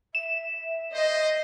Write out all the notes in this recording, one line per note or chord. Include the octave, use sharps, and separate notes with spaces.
E5 E7
C5 D#5